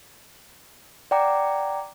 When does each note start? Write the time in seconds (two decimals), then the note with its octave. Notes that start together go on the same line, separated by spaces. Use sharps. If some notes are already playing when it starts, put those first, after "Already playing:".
1.11 D5 F#5 G5 A#5 D6